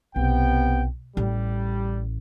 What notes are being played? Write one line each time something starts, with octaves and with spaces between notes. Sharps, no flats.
B1 C3 B3 G5
A1 G3